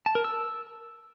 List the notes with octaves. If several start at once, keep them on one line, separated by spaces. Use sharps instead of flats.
A5
A#4
E6